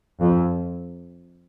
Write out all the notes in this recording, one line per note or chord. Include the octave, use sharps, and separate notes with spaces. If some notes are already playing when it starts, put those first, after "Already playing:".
F2